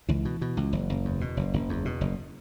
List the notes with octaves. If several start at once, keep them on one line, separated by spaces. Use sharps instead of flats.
C#2 E3
B2
B2
C#2
F#1
F#1
E2
B2
F#1
F#1
E2
B2
F#1